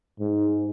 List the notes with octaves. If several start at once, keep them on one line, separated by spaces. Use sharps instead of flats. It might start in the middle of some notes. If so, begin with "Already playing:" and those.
G#2